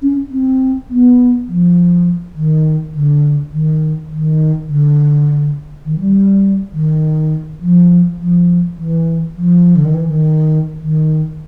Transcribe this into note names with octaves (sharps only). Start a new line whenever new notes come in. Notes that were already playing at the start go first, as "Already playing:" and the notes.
C#4
C4
B3
F3
D#3
D3
D#3
D#3
D3
D#3
G3
D#3
F3
F3
E3
F3
D3
D#3
E3
D#3
D#3